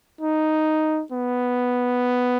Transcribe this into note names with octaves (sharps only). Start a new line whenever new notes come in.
D#4
B3